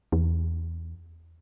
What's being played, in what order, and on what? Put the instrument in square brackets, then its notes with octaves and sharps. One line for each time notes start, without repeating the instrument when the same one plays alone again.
[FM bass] E2